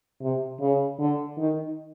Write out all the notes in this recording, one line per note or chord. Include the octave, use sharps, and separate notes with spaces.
C3
C#3
D3
D#3